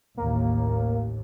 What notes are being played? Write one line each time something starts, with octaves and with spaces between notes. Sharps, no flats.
A1 D#2 A2 A#3